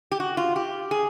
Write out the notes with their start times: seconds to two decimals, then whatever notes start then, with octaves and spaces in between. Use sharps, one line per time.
0.12 G4
0.20 F#4
0.37 F4
0.56 G4
0.91 G#4